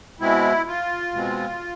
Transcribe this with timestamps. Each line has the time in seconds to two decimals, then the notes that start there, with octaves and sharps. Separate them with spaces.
0.20 B2 G#3 C4 E4
0.67 F4
1.13 B2 G#3 C4